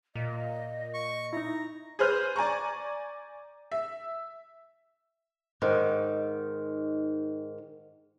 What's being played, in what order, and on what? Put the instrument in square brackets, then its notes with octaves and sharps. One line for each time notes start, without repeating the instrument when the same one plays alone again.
[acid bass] A#2 [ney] D#5
[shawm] C#6
[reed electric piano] D#4 E4 [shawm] A#5
[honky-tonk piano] G#4 B4 C5 F6 G6
D5 G#5 A#5 C#6
E5
[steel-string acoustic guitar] G#2 D#3